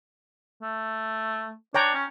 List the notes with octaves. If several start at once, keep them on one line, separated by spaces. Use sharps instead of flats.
A3
D4 C#5 G5 A#5
C#4